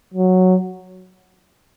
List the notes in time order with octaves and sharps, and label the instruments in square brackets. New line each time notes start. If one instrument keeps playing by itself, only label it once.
[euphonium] F#3